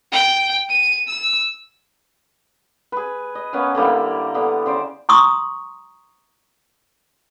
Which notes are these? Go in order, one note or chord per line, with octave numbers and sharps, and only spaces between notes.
G5
D#7
E6
G#4 B4
D#5
A#3 B3 C#4 B4
D3 G3 A#3 E4
D3 B3
C#3 C5 D5
A#5 C6 C#6 D#6